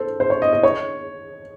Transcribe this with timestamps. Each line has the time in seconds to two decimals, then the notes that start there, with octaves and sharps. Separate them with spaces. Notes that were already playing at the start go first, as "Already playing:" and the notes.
Already playing: A4 C5
0.20 C5
0.30 C#5
0.42 D#5
0.53 D#5
0.63 C#5